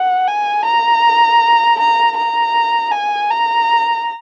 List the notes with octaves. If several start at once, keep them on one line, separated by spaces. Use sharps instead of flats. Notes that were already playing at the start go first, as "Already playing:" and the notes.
Already playing: F#5
G#5
A#5
A#5
A#5
G#5
A#5